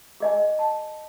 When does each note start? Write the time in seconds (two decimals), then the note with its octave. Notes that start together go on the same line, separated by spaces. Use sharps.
0.20 G#4 D#5 G#5
0.59 A5